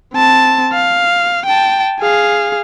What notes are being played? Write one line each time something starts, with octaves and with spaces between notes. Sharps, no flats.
C4 A5
F5
G5 A5
G#4 F5